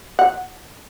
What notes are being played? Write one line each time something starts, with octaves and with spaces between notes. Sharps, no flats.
F#5